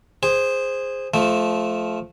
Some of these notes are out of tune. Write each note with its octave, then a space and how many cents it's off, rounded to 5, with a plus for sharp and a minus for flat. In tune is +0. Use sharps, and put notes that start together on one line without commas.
G#4 -15 C5 +0
F3 +0 A3 -20